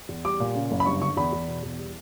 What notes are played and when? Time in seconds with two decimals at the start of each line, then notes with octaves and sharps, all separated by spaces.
0.09 E2
0.25 G3 D6
0.40 A#2
0.55 C#3
0.71 F#1
0.80 B5
0.86 G2 C#6
1.01 D3 C#6
1.17 E2 B5
1.33 E2
1.48 B2
1.63 E2
1.79 G3